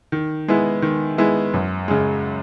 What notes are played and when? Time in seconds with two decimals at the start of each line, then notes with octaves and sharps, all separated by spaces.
0.12 D#3
0.48 G#3 B3 E4
0.82 D#3
1.18 G#3 B3 E4
1.54 F#2
1.88 C#3 G#3